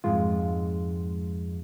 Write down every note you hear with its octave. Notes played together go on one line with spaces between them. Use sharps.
F2 G#2 G#3 F4